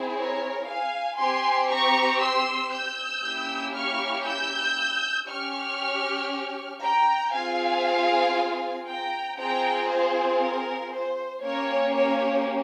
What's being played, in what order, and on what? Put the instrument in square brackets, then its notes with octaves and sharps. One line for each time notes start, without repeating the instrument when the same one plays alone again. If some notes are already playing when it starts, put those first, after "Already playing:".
Already playing: [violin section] C4 E4 G#4
A#4 C#5
F5 G#5
C4 G4 G#5 C6
A#5 C#6
C6 E6
E6 G6
A#3 C#4 E4 G4
C#6 F6
E6 G6
C#4 G4 C#6 F6
G5 A#5
C4 F4 G#4 F5 G#5
G5 A#5
C4 F4 G#4 G5 A#5
C5
A#4
C5
A#3 C#4 G4 A#4 C#5
A#4 C#5